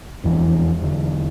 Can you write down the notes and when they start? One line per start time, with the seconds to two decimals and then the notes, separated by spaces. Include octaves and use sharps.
0.24 F1 E2 E3
0.82 E1 E2 D3